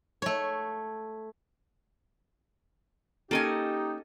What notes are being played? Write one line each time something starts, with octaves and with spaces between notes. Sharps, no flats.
A3 C#5
A#3 C#4 D#4 G4 A4 D#5 G#5